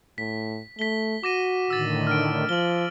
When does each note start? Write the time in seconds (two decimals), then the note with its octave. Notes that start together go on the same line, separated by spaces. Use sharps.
0.18 A2 B6
0.79 A3 B6 G7
1.24 F#4 D6 A#6 D#7
1.70 A2 D3 D#3 E6 A6
2.07 D4 F6 D7
2.49 F3 F#7 G7